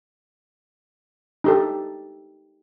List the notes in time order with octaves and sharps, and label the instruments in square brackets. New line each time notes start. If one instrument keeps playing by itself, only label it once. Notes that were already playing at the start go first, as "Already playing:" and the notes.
[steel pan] D#4 G4 A4